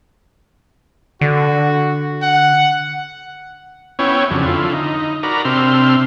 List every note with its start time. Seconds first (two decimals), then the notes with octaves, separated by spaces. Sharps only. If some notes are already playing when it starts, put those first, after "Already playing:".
1.21 D3 F#4
2.22 F#5
3.99 B3 C#4 E4 C#5 G5
4.31 F2 C#3 F#3 D4
4.46 D3 E4 F4
4.73 D#4
5.23 F#4 A#4 D5 A#5 B5
5.45 C3 C4 D4 E5 C6 F6